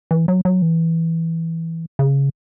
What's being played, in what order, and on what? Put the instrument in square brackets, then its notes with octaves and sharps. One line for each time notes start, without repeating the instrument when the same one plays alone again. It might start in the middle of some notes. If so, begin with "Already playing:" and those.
[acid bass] E3
F#3
F#3
E3
C#3